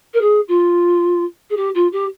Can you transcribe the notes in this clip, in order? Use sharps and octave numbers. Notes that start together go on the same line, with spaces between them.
A#4
G#4
F4
G#4
G4
F4
G4